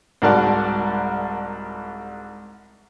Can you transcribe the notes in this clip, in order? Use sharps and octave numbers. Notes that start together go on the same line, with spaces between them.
C2 G#2 F#4 A#4 D5 A5